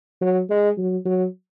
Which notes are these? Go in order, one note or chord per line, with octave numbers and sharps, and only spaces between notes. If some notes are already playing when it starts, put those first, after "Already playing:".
F#3
G#3
F#3
F#3